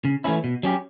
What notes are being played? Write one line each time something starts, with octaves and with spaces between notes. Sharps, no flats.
C#3
E3 A3 C#4 E4
B2
F#3 C#4 G4